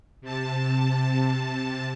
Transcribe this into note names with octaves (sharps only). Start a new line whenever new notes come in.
C3 A5